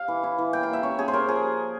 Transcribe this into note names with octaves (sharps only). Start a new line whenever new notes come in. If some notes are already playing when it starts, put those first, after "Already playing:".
Already playing: F5
E3
E4
E3
A#3 G5
F5
A#3 E5
C#4 C#5
C#4 G#4
C5
C#4 A#4
F3 G#4